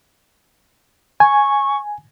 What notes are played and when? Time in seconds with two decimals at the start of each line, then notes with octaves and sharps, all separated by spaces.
1.20 G#5 C#6